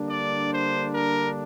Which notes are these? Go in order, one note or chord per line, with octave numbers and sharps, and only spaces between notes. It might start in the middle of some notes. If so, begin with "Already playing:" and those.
Already playing: D3 G3 A#3 D4
D5
C5
A#4